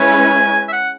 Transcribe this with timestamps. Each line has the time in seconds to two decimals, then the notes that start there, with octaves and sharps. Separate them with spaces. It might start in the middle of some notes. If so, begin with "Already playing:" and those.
Already playing: G#3 C#4 E4 B4 G#5
0.68 E5
0.73 F#5